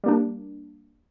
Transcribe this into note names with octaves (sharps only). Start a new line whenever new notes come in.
G3 A#3 D4